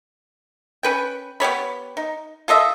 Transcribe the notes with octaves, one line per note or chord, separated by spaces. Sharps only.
C#4 B4 G5
B3 G4 C#5 B5
D#4
F4 A4 D#5 E5